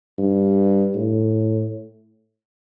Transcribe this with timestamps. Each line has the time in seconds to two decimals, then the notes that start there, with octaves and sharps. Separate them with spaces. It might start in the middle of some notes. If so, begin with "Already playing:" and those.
0.18 G2
0.95 A2